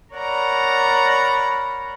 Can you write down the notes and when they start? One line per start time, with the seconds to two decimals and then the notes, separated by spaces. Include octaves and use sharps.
0.14 A#4 C#5 D5 F#5 A#5 B5